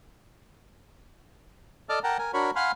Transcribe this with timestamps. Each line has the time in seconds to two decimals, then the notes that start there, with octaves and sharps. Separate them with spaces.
1.89 A4 D5 D#5 A5 D6 F6
2.04 A#4 F#5 G5 A5 A#5
2.19 A#4 G#5
2.34 D4 F#4 A#4 C#5 B5
2.56 F5 F#5 G#5 B5 C6 F6